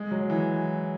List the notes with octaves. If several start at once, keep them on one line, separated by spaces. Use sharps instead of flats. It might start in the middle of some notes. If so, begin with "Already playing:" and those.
Already playing: G#3
F#3
E3